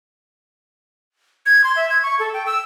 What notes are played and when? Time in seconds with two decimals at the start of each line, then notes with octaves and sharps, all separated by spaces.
1.46 G#6
1.64 C6
1.76 E5
1.90 G#6
2.03 C#6
2.19 A4
2.34 G5
2.46 E6